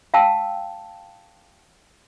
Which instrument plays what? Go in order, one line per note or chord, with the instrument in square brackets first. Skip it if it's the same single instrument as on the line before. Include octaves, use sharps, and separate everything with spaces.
[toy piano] F5 G5 A5 E6